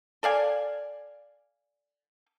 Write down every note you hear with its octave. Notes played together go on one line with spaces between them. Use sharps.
A4 D5 F5 G#5